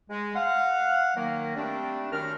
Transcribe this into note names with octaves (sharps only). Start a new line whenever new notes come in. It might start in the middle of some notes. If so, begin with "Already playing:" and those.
G#3
F5 F#5
D#3 F#3 A#3
G3 A3 C4 D4
F#2 D#3 D4 A#4 F6